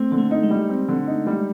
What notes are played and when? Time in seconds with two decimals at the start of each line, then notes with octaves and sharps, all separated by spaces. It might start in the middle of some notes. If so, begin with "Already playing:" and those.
Already playing: A3 C4
0.11 D3 A#3
0.18 A3
0.31 D#4
0.43 G#3
0.50 G3
0.69 C4
0.88 D3
1.07 D#4
1.27 G3